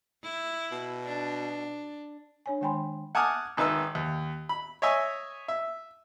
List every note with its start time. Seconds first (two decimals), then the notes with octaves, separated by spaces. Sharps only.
0.23 E4
0.72 B2
1.04 D4
2.46 D4 C#5 G#5
2.61 D#3 G#3 G5 G#5 B5 C6
3.15 F#5 G#5 A5 D6 D#6 F6
3.57 G#1 D#3 B4 E5 E6
3.95 D#2
4.49 B5
4.82 C#5 D#5 E5 G#5 D#6
5.48 E5